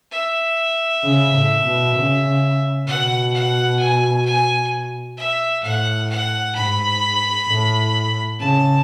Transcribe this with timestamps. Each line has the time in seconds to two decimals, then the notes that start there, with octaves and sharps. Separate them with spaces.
0.11 E5
1.03 C#3
1.34 A2
1.65 B2
1.96 C#3
2.87 B2 F#5
3.33 F#5
3.80 G#5
4.25 G#5
5.17 E5
5.63 A2 F#5
6.09 F#5
6.55 G#2 B5
7.47 A2
8.40 C#3 A5